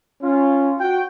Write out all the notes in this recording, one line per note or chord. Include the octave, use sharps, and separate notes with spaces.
C#4 F4
F#4 G5